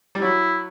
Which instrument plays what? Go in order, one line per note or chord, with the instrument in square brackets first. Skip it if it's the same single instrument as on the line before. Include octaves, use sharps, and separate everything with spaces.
[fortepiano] G3
[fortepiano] F#3 [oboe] E4